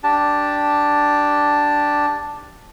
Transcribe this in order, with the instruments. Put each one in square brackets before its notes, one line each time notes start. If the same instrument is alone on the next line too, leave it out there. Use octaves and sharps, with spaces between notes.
[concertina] D4 G4 A5